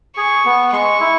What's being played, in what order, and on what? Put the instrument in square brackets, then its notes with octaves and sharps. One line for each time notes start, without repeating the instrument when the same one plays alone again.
[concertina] G#4 [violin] C#6
[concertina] B3
[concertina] G#3 [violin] C#6
[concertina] E4